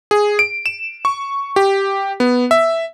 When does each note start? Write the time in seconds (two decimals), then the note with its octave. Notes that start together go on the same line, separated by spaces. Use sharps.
0.11 G#4
0.39 D7
0.66 E7
1.05 C#6
1.56 G4
2.20 B3
2.51 E5